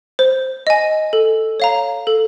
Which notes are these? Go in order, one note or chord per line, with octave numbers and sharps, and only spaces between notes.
C5
D#5 G#5
A4
C#5 F5 A#5
A4